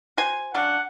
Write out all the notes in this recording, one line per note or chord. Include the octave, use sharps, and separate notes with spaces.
F#4 C5 G#5
C#3 F#3 D4 F#5